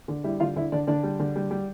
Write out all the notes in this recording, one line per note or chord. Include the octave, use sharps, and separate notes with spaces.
D3
G3 E4 E5
D3 F4 F5
D3 E4 E5
D3 D4 D5
D3 D4 D5
G3
D3
G3
G3